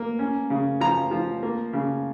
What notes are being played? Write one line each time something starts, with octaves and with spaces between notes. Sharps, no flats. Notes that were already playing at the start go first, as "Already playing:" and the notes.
Already playing: A#3
C#4
C#3
F3 A#5
F3
A#3
C#3